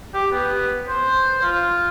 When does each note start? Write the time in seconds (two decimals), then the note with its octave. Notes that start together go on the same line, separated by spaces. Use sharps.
0.14 G4
0.31 B3
0.88 C5
1.42 F4